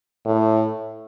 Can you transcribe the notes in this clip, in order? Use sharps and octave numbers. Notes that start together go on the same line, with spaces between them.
A2